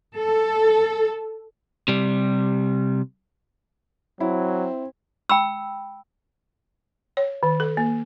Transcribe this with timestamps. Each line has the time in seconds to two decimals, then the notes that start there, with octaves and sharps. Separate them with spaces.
0.18 A4
1.88 C3 G3
4.20 F#3 C4 E4
5.29 G5 B5 E6
7.17 C#5
7.43 D#3
7.60 A4
7.77 A#3